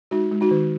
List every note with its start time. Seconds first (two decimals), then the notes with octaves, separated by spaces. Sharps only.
0.11 G#3 D#4 F#4
0.32 G#3
0.41 D#4 F#4
0.51 D#3